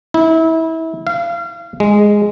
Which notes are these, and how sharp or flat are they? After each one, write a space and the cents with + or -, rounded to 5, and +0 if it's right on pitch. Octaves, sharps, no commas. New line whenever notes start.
E4 -30
F5 -30
G#3 -5